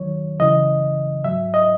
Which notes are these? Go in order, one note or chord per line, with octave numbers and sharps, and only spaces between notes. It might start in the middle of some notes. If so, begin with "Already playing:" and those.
Already playing: D#2 D#3 F#3 C#5
F#2 C#3 E3 D#5
G#2 F#3 E5
D#5